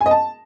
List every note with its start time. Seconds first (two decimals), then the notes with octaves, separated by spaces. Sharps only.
0.01 G#5
0.06 D#5
0.11 A5